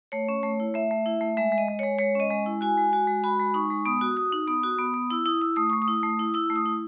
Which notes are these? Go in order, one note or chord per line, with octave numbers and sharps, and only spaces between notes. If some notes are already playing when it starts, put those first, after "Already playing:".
A3 C#5
C#4
A3
E4
A3 E5
A3
E4
A3
G#3 E5
G#3
D#5
G#3
G#3 C#5
G#3 C#5
C#4 D#5
G#3
E4
F#4 G#5
G#3
F#4
G#3
F#4 B5
G#3
D#4 C#6
G#3
B3 D#6
F#4
F#4 D#6
D#4
B3 D#6
F#4
B3
B3
E4 E6
E4 D#6
E4 E6
A3 D#6
A3 C#6
D#6
E4
A3
E4
E4 E6
A3
D#6
E4